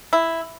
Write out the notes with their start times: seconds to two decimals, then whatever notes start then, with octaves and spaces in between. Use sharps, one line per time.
0.13 E4